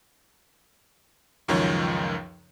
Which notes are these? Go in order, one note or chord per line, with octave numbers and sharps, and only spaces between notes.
C#2 F#2 D#3 F3 C#5